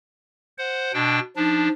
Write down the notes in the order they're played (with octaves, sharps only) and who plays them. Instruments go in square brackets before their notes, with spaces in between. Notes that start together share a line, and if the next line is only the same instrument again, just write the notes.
[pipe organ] C5 F#5
B2 D4 G5
[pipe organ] F3 D4 [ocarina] D#4